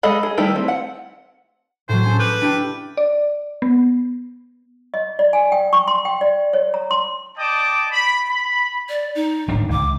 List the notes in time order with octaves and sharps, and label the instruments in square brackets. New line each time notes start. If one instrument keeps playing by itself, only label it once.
[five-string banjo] G#3 G#4 A4 D#5 B5
G#4
D#3 G3 A3 E4 G4
A3 C4
F#5
[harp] A2 F#3 [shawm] C5
[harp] C#4 G#4 A4
[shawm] B4 [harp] D6 F6 G6
[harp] D4 E4 G4
[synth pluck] D5
B3
[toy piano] D#5
D5
G#5
G5
C#6
C6
G5
D5
C#5
A#5
C6
[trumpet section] D5 D#5 G5 A5 D6
B5
B5
[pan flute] D5
D#4
[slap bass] D1 G#1 D4
[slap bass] C#2 [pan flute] D6